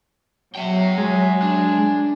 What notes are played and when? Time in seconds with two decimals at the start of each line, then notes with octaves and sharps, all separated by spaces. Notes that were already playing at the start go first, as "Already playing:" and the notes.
0.55 F#3 E5 G5
0.98 G#3
1.42 D4